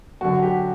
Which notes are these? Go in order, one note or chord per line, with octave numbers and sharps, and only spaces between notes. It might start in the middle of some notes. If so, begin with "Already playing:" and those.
F#2 D3 F#4
G4